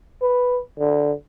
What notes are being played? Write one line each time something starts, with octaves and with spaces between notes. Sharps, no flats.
B4
D3